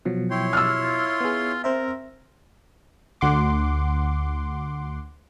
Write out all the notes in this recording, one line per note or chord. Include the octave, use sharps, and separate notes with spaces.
B2 F3 F#3
E4 C#5 G5 C6
D4 E6 F6
F4
B3 G#4
C4 A#4 C5 E5
D2 F#5 C6 D6